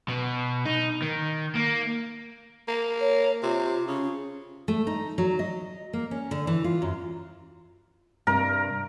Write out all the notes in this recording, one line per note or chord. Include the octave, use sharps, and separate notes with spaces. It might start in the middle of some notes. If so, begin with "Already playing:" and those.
B2
D#4
D#3
A#3
A#3
C#5
C3 F4
C#3 C#4
A3
D#4
F#3
D#5
A#3
C#4
D3
E3
F4
F#2
G2 C3 A#4